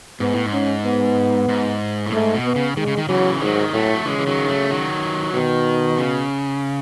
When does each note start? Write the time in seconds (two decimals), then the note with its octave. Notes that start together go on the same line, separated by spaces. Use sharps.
0.20 G#2 B3
0.33 A2
0.46 G#2
0.53 C#4
0.85 B3
1.49 G#2
2.06 A2
2.12 G#2 A3
2.34 B2
2.45 B3
2.56 C#3
2.77 D#3 G#3
2.87 C#3
2.97 D#3
3.09 C#3 E3 F#3
3.41 G#2 D#3 F#3
3.69 G#3
3.73 A2 F#3 A3
3.93 F#3
4.05 C#3 E3 G#3
4.18 E3
4.27 D#3 F#3
4.48 F#3 A3
4.70 D#3 F#3
5.34 B2 D#3
5.98 C#3